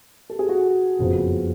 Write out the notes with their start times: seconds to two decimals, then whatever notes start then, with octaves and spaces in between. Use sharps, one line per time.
0.30 A4
0.39 G#4
0.49 F#4
0.99 F#1 F2 C#3 F3 B3